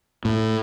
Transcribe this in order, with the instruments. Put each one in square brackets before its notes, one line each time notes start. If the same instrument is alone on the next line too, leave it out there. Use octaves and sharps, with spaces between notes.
[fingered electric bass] A2